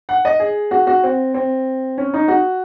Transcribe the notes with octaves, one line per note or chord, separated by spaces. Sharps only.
F#5
D#5
G#4
F#4
F#4
C4
C4
C#4
D#4
F#4